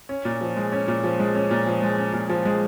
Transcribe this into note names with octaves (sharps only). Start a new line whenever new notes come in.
C#4
A#2
F3
G#3
C#4
A#2
F3
G#3
C#4
A#2
F3
G#3
C#4
A#2
F3
G#3